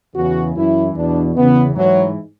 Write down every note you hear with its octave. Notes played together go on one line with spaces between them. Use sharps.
E2 C#3 E3 F#4
F#2 E3 E4
E2 B2 D4
E2 C#3 E3 B3
G#2 E3 F#3